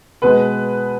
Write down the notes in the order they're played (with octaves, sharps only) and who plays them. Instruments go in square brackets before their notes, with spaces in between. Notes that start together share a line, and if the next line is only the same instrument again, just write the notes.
[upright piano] B2 G#3 B4